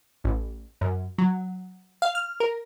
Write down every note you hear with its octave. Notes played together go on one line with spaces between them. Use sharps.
A1
F#2
F#3
F5
F6
A#4